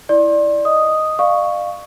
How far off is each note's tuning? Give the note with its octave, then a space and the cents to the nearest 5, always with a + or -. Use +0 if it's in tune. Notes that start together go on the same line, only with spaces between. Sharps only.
E4 +0 D5 +0 C6 +35
D#5 +0 D#6 +0
D5 +45 F5 +0 C#6 +0